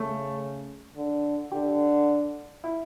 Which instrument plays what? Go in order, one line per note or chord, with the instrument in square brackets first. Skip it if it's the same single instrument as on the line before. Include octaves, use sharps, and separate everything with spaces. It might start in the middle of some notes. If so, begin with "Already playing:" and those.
Already playing: [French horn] C#3 [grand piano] A3
[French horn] D3
[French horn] D3 [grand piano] G4
[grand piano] E4